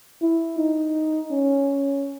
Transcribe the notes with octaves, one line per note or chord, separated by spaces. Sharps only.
E4
D#4
C#4